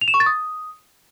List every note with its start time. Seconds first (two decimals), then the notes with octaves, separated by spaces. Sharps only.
0.01 F7
0.08 E7
0.14 C#6
0.20 A6
0.26 D#6